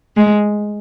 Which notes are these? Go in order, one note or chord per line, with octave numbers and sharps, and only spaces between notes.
G#3